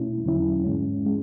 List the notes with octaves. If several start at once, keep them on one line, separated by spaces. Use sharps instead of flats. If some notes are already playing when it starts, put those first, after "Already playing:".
Already playing: B2 A3 C#4 E4
E2 D3 F#3 C#4 E4
G#2 G#3 C#4
G#3